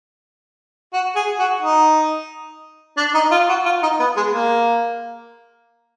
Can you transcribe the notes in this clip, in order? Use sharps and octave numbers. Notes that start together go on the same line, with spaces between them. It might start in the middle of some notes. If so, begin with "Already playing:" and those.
F#4
G#4
F#4
D#4
D4
D#4
F4
F#4
F4
D#4
B3
G#3
A#3